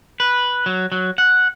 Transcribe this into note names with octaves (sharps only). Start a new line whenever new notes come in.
B4
F#3
F#3
F#5